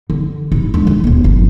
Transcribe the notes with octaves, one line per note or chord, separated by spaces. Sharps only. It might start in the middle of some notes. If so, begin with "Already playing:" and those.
D3
A1 E4
G#3 D4
E3
D1 B3
G1 F3